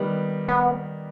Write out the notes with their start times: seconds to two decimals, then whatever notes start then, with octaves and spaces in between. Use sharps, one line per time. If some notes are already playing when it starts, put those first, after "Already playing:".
Already playing: D#3 G3 B3
0.48 B3